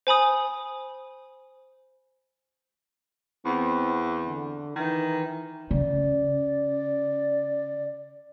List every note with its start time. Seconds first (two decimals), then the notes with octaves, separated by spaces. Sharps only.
0.07 C5 G#5 B5 D#6
3.46 E2 C4
4.27 D3
4.76 D#3 E3
5.71 C#3 D5